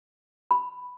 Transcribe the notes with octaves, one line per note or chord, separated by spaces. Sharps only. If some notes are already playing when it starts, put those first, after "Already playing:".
B5